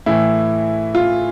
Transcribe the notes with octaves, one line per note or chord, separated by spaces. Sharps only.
A2 E3 E4
F4